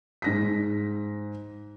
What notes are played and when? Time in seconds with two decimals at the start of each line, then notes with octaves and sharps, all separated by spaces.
0.22 G#2 A#6 B6